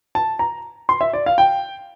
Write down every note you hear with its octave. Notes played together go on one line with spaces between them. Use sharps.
A5
A#5
C6
E5
D5
F5
G5